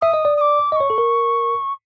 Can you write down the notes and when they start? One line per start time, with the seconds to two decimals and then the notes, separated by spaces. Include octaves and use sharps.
0.02 E5 D#6
0.14 D#5
0.25 D5
0.37 D#6
0.41 D6
0.72 D#5 D6
0.76 C#5 C#6
0.90 A4
0.98 A#4